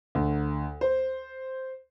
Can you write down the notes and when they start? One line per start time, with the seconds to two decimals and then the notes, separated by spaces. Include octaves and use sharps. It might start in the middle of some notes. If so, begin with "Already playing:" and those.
0.15 D2
0.81 C5